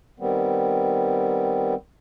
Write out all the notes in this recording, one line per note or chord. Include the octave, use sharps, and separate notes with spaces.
D#3 G3 B3 C4